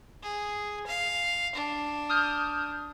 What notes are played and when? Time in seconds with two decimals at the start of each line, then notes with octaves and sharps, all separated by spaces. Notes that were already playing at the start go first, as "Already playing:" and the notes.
0.23 G#4
0.87 F5
1.55 D4
2.09 D#6 F6 G6